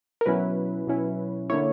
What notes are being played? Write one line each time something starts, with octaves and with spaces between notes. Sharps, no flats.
A#4
B2 F#3 C#4 E4 B4
B2 F#3 C#4 E4
D3 A#3 E4 C#5